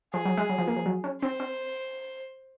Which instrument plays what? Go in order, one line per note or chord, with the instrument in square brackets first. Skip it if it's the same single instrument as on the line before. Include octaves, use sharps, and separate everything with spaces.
[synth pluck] F3 [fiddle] G#4
[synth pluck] F#3
G#3
F#3
F3
A#3
F3
F#3
C#4
[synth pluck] C4 [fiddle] C5
[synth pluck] C4